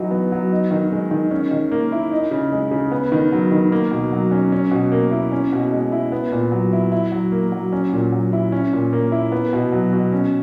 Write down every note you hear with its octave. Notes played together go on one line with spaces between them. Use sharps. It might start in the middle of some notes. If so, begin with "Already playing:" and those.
Already playing: E3 F#3 D#4
B3
F#3
D#4
D#3
G#3
D#3
C#4
D#3
A#3
E4
D#4
C#3
G#3
C#3
B3
D#3
F#3
D#3
A#3
B2
F#3
C#4
C#4
B2
A#3
E4
C#4
B2
G#3
E4
B3
A#2
F#3
E4
E4
F#3
A#3
F#3
C#4
A#2
F#3
E4
C#4
A#2
A#3
E4
B3
B2
F#3
B2
C#4